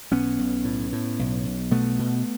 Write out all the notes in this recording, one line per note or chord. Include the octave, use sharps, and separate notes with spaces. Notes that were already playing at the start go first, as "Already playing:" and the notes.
B1 B3 C#4
B1
A2
A2
B1
B1
B2 A3 B3
B2